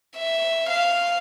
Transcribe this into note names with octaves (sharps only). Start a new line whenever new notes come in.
E5
F5